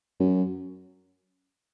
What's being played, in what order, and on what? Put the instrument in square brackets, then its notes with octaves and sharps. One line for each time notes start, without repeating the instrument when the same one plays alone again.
[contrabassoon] F#2